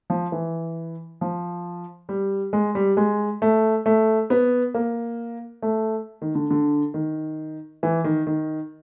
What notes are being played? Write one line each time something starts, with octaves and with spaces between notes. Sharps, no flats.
F3
E3
F3
G3
G#3
G3
G#3
A3
A3
B3
A#3
A3
D#3
D3
D3
D#3
E3
D#3
D#3